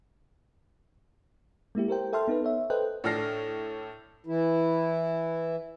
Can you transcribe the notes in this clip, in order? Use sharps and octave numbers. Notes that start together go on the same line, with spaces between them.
G#3 A#3 E4 G4
G4 A#4 C5 G5
A4 E5 G5 A5 C6 F6
B3 D#4 A4 B4
C#5 E5
A4 B4 C5 D#5 G5 F#6
A2 D4 A4 F6 A#6 C7
E3 E4